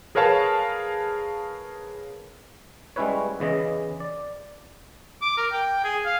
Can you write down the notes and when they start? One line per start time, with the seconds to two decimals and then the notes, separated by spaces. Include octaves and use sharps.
0.15 G#4 A#4 B4 C#5 F5 A5
2.96 G3 G#3 C#4 E4 B4 C#5
3.40 E2 C#3 E3 D#5
4.00 D5
5.22 D6
5.38 A#4
5.52 G5
5.84 G#4
6.05 F5